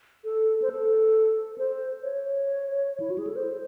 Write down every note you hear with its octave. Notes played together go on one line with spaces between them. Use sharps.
A4
C5
A4
A4
C5
C#5
E4
F#4
G#4
A4
C5